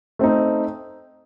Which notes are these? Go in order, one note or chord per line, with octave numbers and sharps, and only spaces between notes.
A3 C4 D#4